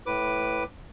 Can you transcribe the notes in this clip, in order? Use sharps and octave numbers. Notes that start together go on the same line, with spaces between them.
A2 B4 D6